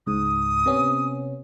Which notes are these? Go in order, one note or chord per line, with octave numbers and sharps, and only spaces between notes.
C#2 G#2 D#6
C3 B3 C#4